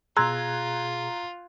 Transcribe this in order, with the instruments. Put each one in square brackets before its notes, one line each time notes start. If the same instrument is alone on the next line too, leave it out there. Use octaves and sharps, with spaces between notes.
[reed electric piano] B2 G#4 [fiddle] F4 [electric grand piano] A#5 F#6 G#6 [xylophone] C6 E6